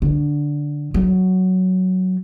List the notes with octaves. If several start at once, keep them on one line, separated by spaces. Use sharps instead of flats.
D3
F#3